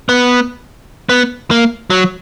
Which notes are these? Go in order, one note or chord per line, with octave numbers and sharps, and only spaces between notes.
B3
B3
A#3
F#3